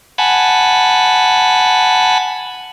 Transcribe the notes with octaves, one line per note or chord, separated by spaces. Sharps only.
F#5 G#5 A5 B5